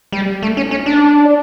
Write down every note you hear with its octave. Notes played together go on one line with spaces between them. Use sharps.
G3
A3
C#4
C#4
D4